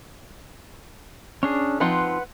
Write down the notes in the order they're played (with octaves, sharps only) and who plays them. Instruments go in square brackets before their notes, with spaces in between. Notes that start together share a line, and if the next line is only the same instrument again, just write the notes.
[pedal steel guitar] C#4 D4 G#4
[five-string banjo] F3 C4 D#4 [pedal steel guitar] B4 F#5 C6